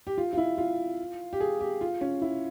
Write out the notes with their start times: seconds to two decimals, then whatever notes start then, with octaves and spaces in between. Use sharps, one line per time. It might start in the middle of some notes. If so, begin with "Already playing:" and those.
0.07 G4
0.18 F4
0.33 F4
0.37 E4
0.58 F4
1.33 G4
1.40 G#4
1.61 G4
1.81 F4
2.01 C#4
2.22 E4